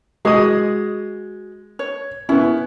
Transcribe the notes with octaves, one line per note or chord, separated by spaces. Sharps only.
G#3 F#4 G#4 D#5 D#6
C#5
B3 C#4 E4